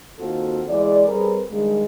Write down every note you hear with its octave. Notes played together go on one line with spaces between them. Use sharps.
D#2 C4 F4 F#4 A4
E2 G#3 D5
G3 C4 G#4 A#4 B4
G2 D#3 G#3